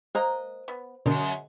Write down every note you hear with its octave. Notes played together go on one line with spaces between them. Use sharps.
G#3 A#3 A#4 C5 D#5
B3
F#2 B2 D3 F#3 G#3 A#4